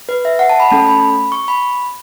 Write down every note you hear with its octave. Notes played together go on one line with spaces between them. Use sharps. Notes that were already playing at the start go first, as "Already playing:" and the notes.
B4
E5
F#5
A5
B5
A3 C#4 A4 A5
B5
C#6
B5